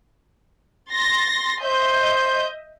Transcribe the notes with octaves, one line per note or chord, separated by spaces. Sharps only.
C6 A6 A#6
C5 D#5 E5 G6